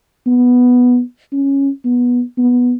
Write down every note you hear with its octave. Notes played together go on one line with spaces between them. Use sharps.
B3
C#4
B3
B3